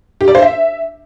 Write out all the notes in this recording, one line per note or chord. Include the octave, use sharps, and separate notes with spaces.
G4
D5
C5
E5